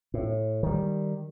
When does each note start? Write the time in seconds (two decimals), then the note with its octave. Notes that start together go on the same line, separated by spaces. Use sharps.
0.14 A2
0.63 D#3 G3